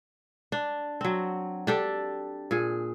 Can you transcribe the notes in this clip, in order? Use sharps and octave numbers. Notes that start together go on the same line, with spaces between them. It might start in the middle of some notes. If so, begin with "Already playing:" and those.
D4
F#3 C4
D4 G4 A4
A#2 G#4